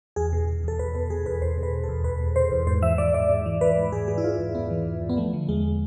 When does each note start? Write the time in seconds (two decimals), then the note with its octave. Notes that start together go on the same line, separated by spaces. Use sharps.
0.16 E2 G#4
0.32 B2
0.48 B2
0.64 E2 A4
0.79 E2 B4
0.95 B2 B4
1.10 B2 G#4
1.26 E2 B4
1.42 E2 C5
1.57 B2
1.63 B4
1.73 B2
1.83 A4
1.89 E2
2.04 E2 B4
2.20 B2
2.36 B2 C5
2.51 E2
2.67 G#2 C5
2.82 E3 E5
2.98 E3 D5
3.14 G#2 D5
3.30 G#2
3.46 E3
3.61 E3 B4
3.77 G#2
3.92 G#2 G#4
4.08 E3 G#4
4.18 E4
4.23 E3 F4
4.39 G#2
4.55 G#2 B3
4.70 E3
4.86 E3
5.02 G#2
5.09 B3
5.17 F3 A3
5.33 D3
5.49 E2 G#3